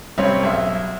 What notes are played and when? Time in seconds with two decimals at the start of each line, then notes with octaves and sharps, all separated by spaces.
0.18 C2 C4 C#4 C#5
0.43 B1 E5